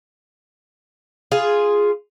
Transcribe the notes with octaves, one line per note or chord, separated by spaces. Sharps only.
F4 G#4